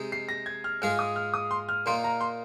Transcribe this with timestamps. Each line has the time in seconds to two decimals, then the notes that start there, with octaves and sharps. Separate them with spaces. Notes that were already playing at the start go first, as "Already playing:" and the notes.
Already playing: C3 G#3 D#4
0.12 C7
0.29 A#6
0.46 G#6
0.64 F6
0.82 G#2 G#3 F4 G#4 F6
0.99 D#6
1.16 F6
1.34 D#6
1.51 C6
1.69 F6
1.86 A#2 A#3 D#4 C6
2.04 A#5
2.21 C6